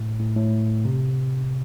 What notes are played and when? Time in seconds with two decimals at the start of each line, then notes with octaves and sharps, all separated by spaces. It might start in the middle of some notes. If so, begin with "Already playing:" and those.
Already playing: A2
0.19 A2
0.35 A2
0.85 C3